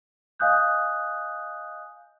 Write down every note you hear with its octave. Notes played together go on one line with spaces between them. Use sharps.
D#5 F5 G#5 D#6 F#6 G6